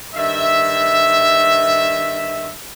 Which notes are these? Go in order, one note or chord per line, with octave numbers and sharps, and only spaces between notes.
G2 D#3 E5